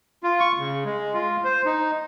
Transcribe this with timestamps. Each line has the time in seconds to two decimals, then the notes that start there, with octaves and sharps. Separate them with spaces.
0.23 F4
0.40 C#6
0.58 C#3
0.85 G#3
1.14 F4
1.44 C5
1.66 D#4